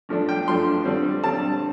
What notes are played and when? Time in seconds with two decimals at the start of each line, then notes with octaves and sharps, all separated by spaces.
0.09 G2 F3 A3 D4
0.29 G5
0.47 G2 F3 A3 D4 C6
0.85 G2 D3 G3 C4
1.23 G2 D3 G3 C4 A5